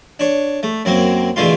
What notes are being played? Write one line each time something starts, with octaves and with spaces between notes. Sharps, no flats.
D4 C#5
A3
F#2 F#3 A#3 C4
E2 B2 D3 A3 F4 C6